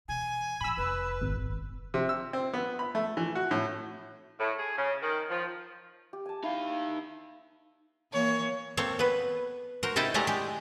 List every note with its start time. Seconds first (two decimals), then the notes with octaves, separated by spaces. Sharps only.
0.08 B2 E3 G#5
0.61 A2 E3 B5 E6
0.77 F1 B4
1.21 G#1
1.94 C3
2.09 E6
2.33 C4
2.54 B3
2.79 B5
2.95 A3
3.17 E3
3.35 F#4
3.51 A2
4.40 A2
4.58 G#4
4.77 C#3
5.01 D#3
5.30 F3
6.13 G4
6.26 G#5 A5
6.43 D#4 E4 G4 F5
8.13 E3 A#3 C#5
8.77 A#3 C4 A4 C5 C#5
8.99 B3 B4
9.83 F#4 A#4 C5
9.96 C3 D#4 E4 D#5 G5 A5
10.14 F#3 G#3 A3 G4 D5 A#5
10.27 G#3 G4 G5